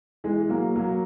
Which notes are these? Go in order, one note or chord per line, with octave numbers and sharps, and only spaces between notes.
E3 G#3
F#3 A#3
F#3 A#3